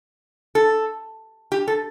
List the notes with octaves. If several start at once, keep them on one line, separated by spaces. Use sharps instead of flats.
A4
G4
A4